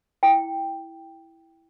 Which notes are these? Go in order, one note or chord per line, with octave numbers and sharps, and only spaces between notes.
E4 G5